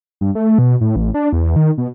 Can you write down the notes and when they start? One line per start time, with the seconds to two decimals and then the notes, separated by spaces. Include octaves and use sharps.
0.21 G2
0.35 A3
0.59 B2
0.81 A2
0.96 A1
1.14 D4
1.33 E2
1.56 D#3
1.78 B2